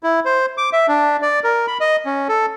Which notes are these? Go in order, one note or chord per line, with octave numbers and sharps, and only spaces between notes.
E4
C5
D6
E5
D4
D5
A#4
B5
D#5
C#4
A4